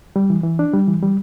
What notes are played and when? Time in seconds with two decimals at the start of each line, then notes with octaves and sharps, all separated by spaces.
0.16 G3
0.30 E3
0.44 E3
0.59 D4
0.73 G3
0.87 E3
1.02 G3